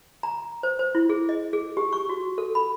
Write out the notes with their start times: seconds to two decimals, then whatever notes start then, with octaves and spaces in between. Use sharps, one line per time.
0.23 A#5
0.63 C5
0.79 C5
0.95 E4
1.09 G#4
1.29 D#5
1.53 G#4
1.77 G4
1.93 C#6
2.09 F#4
2.38 A4
2.55 B5